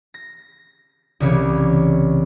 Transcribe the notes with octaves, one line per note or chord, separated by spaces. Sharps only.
A#6
C2 C#3 E3 C#5 D6